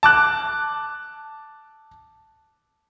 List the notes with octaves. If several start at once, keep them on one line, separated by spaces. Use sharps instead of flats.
A5 D6 F#6